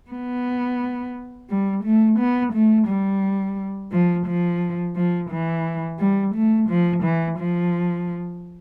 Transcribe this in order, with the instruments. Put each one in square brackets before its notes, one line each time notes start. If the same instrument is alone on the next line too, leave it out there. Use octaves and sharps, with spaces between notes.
[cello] B3
G3
A3
B3
A3
G3
F3
F3
F3
E3
G3
A3
F3
E3
F3